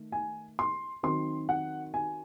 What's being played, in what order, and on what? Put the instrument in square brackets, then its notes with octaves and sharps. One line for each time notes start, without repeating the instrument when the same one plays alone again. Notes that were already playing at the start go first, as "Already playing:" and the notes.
Already playing: [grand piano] D#3 A3
G#5
C6
D#3 F#3 C4 C6
F#5
G#5